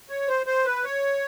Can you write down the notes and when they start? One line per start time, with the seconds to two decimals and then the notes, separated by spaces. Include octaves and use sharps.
0.09 C#5
0.28 C5
0.46 C5
0.65 B4
0.84 C#5